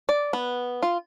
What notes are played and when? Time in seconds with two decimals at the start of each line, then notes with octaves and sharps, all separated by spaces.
0.09 D5
0.33 B3
0.83 F4